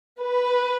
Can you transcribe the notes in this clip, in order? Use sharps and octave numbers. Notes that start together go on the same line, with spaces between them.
B4